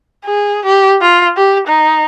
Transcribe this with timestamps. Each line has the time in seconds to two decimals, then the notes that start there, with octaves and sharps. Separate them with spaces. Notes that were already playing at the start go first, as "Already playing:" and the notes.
0.25 G#4
0.65 G4
1.02 F4
1.37 G4
1.67 D#4